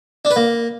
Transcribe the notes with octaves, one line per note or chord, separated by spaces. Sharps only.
D4
B4
A#3